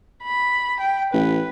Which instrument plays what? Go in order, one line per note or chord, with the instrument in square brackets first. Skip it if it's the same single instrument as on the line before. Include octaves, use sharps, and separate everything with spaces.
[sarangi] B5
G5
[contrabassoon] A1 [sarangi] B4